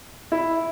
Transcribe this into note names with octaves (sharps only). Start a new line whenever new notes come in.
E4